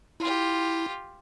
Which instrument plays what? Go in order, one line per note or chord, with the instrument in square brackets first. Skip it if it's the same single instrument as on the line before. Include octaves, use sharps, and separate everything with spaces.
[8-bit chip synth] E4 [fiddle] F4 G4